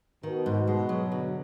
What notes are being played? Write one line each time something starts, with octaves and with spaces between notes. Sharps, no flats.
B2 D#3
G#2
G#3
F#3
D3